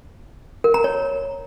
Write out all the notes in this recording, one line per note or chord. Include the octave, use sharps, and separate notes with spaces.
A#4
A#5
C#5